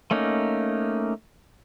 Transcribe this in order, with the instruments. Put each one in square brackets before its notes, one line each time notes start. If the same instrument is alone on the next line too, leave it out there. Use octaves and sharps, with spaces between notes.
[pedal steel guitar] A3 A#3 C#4 D#4